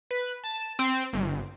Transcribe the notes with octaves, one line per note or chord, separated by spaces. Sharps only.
B4
A5
C4
G1